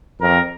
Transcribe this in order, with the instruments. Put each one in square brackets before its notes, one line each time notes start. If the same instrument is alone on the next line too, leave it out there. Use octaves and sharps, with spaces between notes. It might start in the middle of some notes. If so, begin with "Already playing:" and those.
[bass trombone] F2 [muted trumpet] A#4